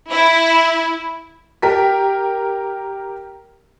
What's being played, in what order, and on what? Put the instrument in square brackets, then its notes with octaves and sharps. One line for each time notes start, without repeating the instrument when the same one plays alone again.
[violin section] E4
[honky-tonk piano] G4 A#4 B6